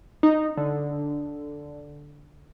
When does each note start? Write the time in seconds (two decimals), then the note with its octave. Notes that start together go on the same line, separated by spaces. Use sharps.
0.23 D#4
0.57 D3